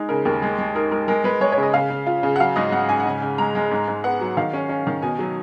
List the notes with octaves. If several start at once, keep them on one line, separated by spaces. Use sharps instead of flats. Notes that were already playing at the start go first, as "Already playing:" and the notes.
Already playing: G#3 D#4
C#3 A#4
D#2 A#4
G#3 G#4
G#3
D#4 A#4
G#3 A#4
G#3 A#4
G#3 B4
G#3 C#5
C#5
C#3
D#5
C#3 F5
C#3
F4
C#3
F#5
F#3 F5
G#2 D#5
G#2 F#5
G#2 G#5
F#5
C#3 G#5
C#3
G#3 A#5
G#3
G#2
G#2
B3 F#5
F#3
D#3 F5
C#4
C#4
D#3
B2 G#5
F#3